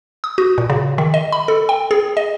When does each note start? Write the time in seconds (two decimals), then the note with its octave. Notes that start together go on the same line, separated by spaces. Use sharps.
0.24 D#6
0.38 F#4
0.58 A#2
0.70 C#3
0.98 D#3
1.14 D#5
1.32 B5
1.48 A4
1.69 G5
1.91 G#4
2.17 D#5